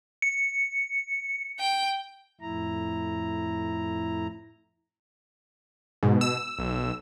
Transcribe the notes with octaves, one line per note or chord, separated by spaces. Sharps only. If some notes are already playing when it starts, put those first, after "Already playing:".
C#7
G5
F2 A2 E4 A#5
G#2 B2
E6
B1